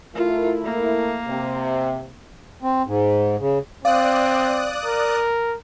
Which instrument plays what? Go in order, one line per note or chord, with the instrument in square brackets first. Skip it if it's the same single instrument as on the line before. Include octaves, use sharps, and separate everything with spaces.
[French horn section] A3 E4 A#4 [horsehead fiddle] F4
[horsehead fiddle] A#3
[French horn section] C3
[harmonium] C4
G#2
C#3
[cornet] C4 [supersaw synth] D5 D#6 F#6 [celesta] F5
[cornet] A#4